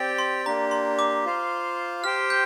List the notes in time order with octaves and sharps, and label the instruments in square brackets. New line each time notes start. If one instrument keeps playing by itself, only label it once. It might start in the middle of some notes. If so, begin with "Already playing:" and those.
Already playing: [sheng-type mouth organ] C4 G4 D5 G5
[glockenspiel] C6
[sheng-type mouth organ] A#3 D4 G4 [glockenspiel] A#5
[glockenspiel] C6
D6
[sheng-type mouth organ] F4 C5 F5
[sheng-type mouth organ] G4 C5 G5 [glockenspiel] F6
[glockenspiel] G6